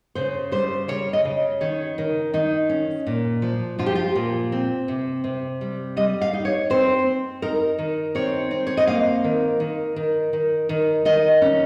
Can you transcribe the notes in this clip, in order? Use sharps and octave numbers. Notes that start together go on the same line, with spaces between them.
C#3 C5
G3 C5
C#3 C#5
D#5
C#3
D#3 C#5
D#3
D#3 D#4
C#4
A#2
F3
F3 F4
G4
F4
A#2
C4
C3
C3
G3
G3 D#5
F5
D#4
C#5
C4 C5
C4
D#4 A#4
D#3
C4 C#5
C4
C#5
D#5
A#3 F5
D#3
D#3
D#3
D#3
D#3
D#3 D#5
C#4